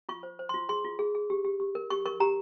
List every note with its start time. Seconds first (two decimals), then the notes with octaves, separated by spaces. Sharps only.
0.09 F4 C#6
0.23 C5
0.39 C5
0.49 F4 C6
0.69 G#4 C6
0.84 F4
0.99 G#4
1.15 G#4
1.30 G4
1.45 G4
1.60 G4
1.75 A#4
1.90 G4 C#6
2.05 A#4 C#6
2.20 G4 A#5